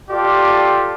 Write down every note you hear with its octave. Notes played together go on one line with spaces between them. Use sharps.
F4 G4 A4 D5